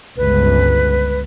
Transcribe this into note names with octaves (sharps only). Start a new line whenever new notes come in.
G1 C#2 B4